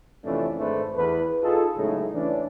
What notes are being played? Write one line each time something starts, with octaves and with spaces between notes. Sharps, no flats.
F2 C3 E3 A3 C#4 D4
G#1 G#3 A3 D4 B4 C5
E2 B4
D#4 F4 G#4 A4
A2 C#3 F#3 G#3 A3 D#4
E3 C#4 D4